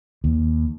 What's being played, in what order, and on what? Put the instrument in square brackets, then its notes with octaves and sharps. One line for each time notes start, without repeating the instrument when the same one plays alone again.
[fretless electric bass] D#2